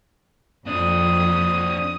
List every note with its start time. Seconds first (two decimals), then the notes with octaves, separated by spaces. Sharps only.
0.67 F2 C4 D4 D#6